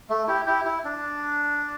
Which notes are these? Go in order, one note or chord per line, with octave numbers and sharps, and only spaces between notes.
A3
E4 G4
E4 G4
E4
D4